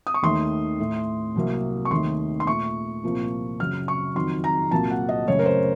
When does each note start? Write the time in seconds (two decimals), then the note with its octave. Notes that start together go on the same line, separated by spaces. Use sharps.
0.07 D#6
0.14 C#6
0.22 D#2 D#3 A3 C6
0.80 A2 A3
1.35 C2 C3 F#3 A#3
1.85 C#6
1.91 D#2 D#3 A3 C6
2.40 C6
2.47 A#2 A3 C#6
3.03 C2 A#2 F3 A#3
3.60 F#2 C#3 F#3 F6
3.88 C#6
4.15 F2 D#3 F#3 C6
4.44 A#5
4.71 C2 A#2 F#3 A#3 A5
4.90 F#5
5.09 D#5
5.28 F#2 C#3 F#3 A3 C#5
5.39 A#4
5.46 C5